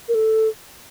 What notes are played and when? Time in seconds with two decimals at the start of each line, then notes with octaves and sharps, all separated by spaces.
0.08 A#4
0.15 A4